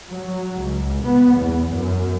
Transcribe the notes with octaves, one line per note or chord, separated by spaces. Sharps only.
F#3
C#2
B3
E2
F#2